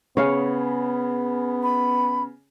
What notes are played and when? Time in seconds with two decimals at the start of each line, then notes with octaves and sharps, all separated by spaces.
0.17 C#3 B3 G#4 C#5 F5
1.63 B5